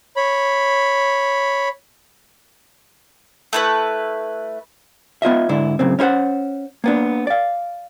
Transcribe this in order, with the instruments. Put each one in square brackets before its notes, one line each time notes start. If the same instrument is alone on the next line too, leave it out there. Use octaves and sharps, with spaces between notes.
[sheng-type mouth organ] C#5 B5
[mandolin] A3 E4 B4
[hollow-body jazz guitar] B3 F4 D#5 E5
G#2 D3 E4
F#2 A2 C#3 C4
C#4 E4 F#4 C5 F#5
A#3 B3 D4
D5 F5